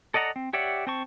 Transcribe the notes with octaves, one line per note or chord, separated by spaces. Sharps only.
A4 D5 D#5 F#5 A#5
C4
G4 C#5 D5 E5 F#5
C4 C5 A5 C#6